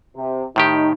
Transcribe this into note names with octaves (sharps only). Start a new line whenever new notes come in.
C3
A2 D#3 D#4 G4